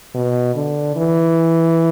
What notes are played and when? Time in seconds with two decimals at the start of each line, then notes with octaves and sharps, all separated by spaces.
0.15 B2
0.55 D3
0.96 E3